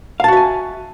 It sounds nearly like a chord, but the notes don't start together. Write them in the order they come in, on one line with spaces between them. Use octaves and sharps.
F5 A5 F#4 E5 G#5